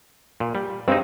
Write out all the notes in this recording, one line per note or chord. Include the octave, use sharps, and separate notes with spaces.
A#2
G3
G2 G#3 C4 D#4